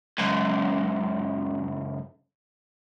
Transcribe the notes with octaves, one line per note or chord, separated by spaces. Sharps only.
C#2 F#2